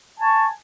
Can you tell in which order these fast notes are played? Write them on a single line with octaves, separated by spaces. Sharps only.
G#5 A5 C#6